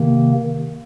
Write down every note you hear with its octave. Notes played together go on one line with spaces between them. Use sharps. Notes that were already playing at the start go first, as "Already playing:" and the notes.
Already playing: C3 D#3 A#3